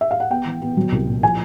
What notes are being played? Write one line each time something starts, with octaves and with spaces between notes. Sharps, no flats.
E5
F5
F#5
B3 G5
E3
B3
F#3
C2
A#2
F3 G#5